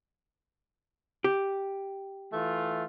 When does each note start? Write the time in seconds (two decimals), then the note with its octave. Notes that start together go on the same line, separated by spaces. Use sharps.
1.24 G4
2.33 E3 A3 F4